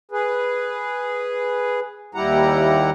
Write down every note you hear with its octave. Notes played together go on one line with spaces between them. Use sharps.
G#4 B4
D#2 G3 E4 G4 F#5 A#5